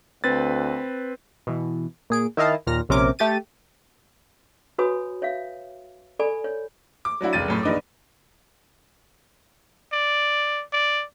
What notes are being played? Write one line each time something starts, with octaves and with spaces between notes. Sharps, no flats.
D2 C4 B4 A6
B2 E3
A#2 G#4 D7
D#3 E4 D#5 F5 A5
D#2 A#2 F6 A#6
A#1 C3 C#4 A#4 D6
A3 G4 A6 D#7
F#4 B4 C#5 G#5 B5 D#6
C#5 E5 F5
A4 D5 G#5 B5
C#5
D6
F#3 D4 E4 F#4
F1 C#2 A6 D#7
F#2 A2
A#1 D4 D#4 B4 D6
D5
D5